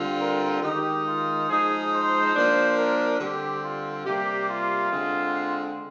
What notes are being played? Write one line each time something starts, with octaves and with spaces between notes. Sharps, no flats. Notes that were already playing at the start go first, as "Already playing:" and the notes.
Already playing: D3 G3 C4 F4
A#4
D#3 G#3 D#4 G4
F4
F3 G#3 D#4 G#4
C5
F3 A#3 D4
A#4
D3 G3 C4 G4
F4
C3 G3 A#3 G4
F4
D3 G#3 C4